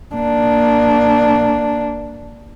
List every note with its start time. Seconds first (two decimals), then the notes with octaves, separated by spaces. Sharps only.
0.15 A#3 D4